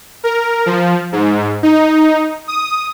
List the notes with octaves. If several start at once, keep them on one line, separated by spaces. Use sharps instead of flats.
A#4
F3
G#2
D#4
D#6